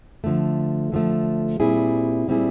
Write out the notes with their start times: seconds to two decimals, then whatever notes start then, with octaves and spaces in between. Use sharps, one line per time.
0.24 D3 F3 A3
0.92 D3 F3 A3
1.60 A#2 G3 C4 E4 G#4
2.28 A#2 G3 C4 E4 G#4